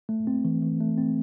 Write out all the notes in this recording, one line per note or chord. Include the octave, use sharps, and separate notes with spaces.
A3
C4
E3
E3
A3
C4